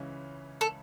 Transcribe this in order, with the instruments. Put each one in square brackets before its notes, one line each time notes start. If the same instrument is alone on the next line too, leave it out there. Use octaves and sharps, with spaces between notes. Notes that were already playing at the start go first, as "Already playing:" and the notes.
Already playing: [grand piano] C#2 C#3 E3 C#4
[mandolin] A4